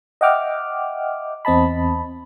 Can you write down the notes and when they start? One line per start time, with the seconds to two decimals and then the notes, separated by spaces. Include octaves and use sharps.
0.21 D#5 E5 F#5 G5 D6 F6
1.45 E2 C4 D#5 A5 B5